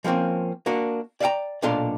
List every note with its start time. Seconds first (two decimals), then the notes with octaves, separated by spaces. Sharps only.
0.04 F3 G3 A#3 C4 C#4
0.66 A#3 D4 F#4
1.20 D5 E5 F5 G5 A#5
1.62 B1 A#2 D4 A4 F5 C6